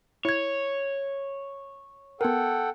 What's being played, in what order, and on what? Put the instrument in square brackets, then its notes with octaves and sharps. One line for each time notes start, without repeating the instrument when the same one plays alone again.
[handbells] E4 G#6 [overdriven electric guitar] C#5
[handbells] B3 A#4 [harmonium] A4 F#5 G5